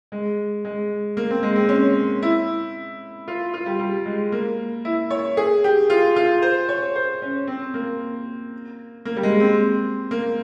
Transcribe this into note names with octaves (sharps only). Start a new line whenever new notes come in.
G#3
G#3
A#3
C4
G#3
C4
C#4
E4
F4
F4
G3
G3
G#3
A#3
E4
C#5
G#4
G4
F4
F4
C5
C#5
C5
C#4
C4
A#3
A#3
G3
G#3
C4
A#3